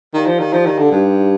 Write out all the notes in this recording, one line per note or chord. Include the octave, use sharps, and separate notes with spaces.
D#3 D#4 G4 D5 F5
F3
D#3
F3 D#4 G4 D5 F5
D#3
D3
G2 D#4 G4 D5 F5